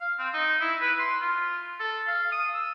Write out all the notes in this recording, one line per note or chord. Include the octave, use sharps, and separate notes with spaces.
F5
C4
D#4
E4
B4
C6
F4
A4
F5
D#6
E6